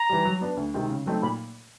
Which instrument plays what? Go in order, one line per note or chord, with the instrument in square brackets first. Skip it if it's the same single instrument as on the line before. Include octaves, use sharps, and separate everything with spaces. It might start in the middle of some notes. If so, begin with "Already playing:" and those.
Already playing: [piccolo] A#5
[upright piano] E3 G3
F#3
B3 D4
D2
C3 D#3 G#3 C4
C#3
F#3 A3 C4 D#4
[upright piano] A#2 [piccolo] B5